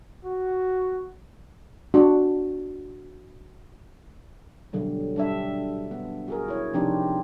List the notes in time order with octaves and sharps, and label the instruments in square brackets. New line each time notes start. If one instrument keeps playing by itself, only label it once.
[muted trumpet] F#4
[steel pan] D4 F#4
[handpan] B2 D3 F#3 G3
G3 D4 E5
B3
F#4 G#4 A#4
E4 C#5
C3 F3 C4 D4 D#4 G4